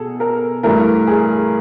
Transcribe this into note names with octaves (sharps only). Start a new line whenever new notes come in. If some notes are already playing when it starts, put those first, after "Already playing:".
Already playing: B2 G#4 A4
A#4
G2 E3 A3 A#4
G#4